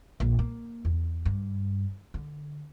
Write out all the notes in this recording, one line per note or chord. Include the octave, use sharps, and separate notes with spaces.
A#1
A#3
E2
G2
D3